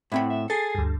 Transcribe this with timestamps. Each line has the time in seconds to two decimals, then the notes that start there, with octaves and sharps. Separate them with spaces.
0.12 A2 C4 E4 F#5 B5
0.30 E5
0.50 G#4 A4 A6 C7
0.75 D2 G2